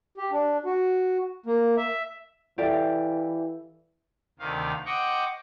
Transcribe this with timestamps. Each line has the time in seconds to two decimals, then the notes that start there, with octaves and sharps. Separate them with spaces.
0.18 G4
0.31 D4
0.65 F#4
1.46 A#3
1.77 E5
2.58 E3 G4 A4 D5 E5 F5
4.39 D2 C3 D#3 F5
4.86 C5 D#5 F#5 G5 C#6 D6